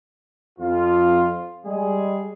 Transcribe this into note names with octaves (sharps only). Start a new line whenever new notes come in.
F2 F4
G3 G#3 G#4